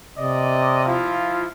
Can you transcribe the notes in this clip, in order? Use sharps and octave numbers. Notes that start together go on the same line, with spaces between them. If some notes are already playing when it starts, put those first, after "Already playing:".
C3 D5 D#5
F3 E4 F4